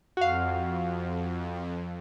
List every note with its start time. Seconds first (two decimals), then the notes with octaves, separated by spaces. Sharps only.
0.17 F2 F#4 F5